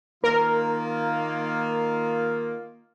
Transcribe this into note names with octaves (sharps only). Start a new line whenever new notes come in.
D#3 A#3 F4 A#4